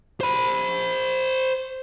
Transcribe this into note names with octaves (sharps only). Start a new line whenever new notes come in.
C5 B5